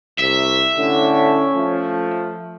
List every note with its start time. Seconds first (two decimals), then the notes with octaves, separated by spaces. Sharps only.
0.19 C2 E5
0.77 A2 D3 C#4
1.54 F3 A3